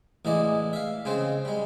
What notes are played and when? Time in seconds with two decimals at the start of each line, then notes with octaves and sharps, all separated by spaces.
0.25 A1 E3 G#3 D5 D#5
0.73 E5 F5
1.05 C#3 G#3 C4 C5
1.45 G3 G#3